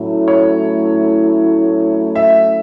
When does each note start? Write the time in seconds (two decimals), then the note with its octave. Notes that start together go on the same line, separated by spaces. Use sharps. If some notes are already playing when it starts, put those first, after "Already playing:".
Already playing: A2 F#3 A3 C#4 E4
0.28 C#5
2.15 E5